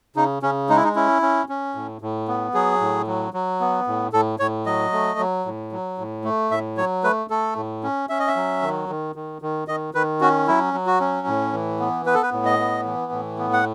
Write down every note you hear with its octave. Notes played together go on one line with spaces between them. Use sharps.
C#3 D#4
C#3 C#4
G#3 D#4
E4
D#4
C#4 E4
C#4
C#4
A2
A2
B3
F#3 G#4
A2
F#3
F#3
B3
A2
A2 A4
A2 C#5
F#3 D#5
A3
F#3
A2
F#3
A2
A3
A2 E5
F#3 C#5
A3 B4
A3 A4
A2
C#4
C#4 E5
D#5
E5
F#3
D#3
D#3
D#3
D#3
D#3 D#5
D#3 B4
C#4 F#4
F#3 E4
F#3
F#4
C#4
A2
E3
B3
B3 B4
A4
B4
A2
D#5
B3
E3
A2
B3
F#5